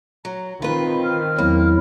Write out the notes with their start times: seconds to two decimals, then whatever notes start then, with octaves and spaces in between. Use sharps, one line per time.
0.25 F#3 A#5
0.62 D#3 C4 F4 B4 B5
1.03 F6
1.38 E2 F#3 A#3 E4